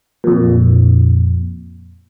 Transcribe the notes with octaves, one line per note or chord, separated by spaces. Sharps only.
F2 A#2